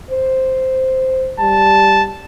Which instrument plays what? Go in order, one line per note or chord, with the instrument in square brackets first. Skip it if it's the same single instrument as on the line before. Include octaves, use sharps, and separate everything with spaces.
[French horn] C5
[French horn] G3 [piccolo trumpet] A5